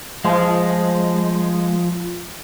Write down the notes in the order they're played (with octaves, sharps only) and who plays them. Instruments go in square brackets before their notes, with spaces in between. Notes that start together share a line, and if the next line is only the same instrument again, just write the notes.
[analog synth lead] F3 [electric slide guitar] G#3